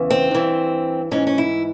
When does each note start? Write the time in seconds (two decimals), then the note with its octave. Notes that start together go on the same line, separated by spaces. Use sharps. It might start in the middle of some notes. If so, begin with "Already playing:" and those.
Already playing: E2 C#3 E3
0.10 C4
0.31 G2 E3
1.11 G#2 E3 C#4
1.27 C#4
1.38 E4